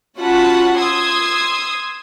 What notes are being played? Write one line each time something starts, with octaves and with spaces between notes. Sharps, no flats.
C#4 F4 F#4 F#5 A5 B5
C6 D#6 E6 G#6